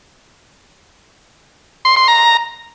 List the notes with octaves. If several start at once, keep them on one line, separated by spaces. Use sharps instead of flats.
C6
C6
A#5